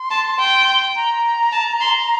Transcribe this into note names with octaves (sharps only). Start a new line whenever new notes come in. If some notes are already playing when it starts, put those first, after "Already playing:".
Already playing: C6
A5
G5
A#5
A5
C6